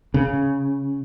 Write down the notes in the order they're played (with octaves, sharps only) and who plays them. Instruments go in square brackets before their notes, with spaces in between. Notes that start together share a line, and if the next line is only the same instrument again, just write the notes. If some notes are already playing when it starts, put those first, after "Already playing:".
[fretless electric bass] C#3